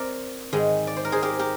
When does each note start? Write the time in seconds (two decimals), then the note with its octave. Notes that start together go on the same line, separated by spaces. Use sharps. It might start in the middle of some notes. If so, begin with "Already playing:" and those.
Already playing: C4 A#4 C5 D5
0.53 G#2 D#3 G#3
0.87 D5
0.96 C5
1.05 A#4
1.12 G#4 C5
1.22 G4 A#4
1.39 G4 A#4